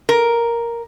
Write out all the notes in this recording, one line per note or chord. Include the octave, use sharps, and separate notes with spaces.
A#4